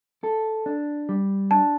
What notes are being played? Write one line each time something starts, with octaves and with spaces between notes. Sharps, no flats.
A4
D4
G3
D4 A5